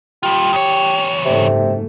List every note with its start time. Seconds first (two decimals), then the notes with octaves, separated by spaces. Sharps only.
0.23 G3 F4 G4
0.53 E2 C#5
1.25 F#1 G#2 C3 A3